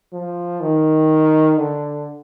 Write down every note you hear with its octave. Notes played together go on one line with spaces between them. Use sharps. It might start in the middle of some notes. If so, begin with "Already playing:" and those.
F3
D#3
D3